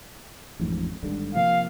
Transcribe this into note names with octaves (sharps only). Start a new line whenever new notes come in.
A1 F2 G#2
G#1 G2 D3
C3 F3 A#3 F5